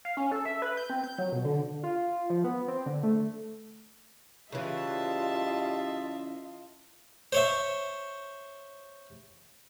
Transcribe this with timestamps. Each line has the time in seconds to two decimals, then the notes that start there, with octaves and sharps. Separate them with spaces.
0.05 F5
0.17 C#4
0.32 A4
0.45 E5
0.62 B4
0.77 G6
0.90 C4
1.04 G6
1.18 F#3
1.32 B2
1.45 D3
1.83 F4
2.30 F3
2.44 B3
2.68 C4
2.86 D3
3.03 A3
4.52 C#3 E3 G3 F4 D#5 E5 A5
7.33 C5 C#5 E5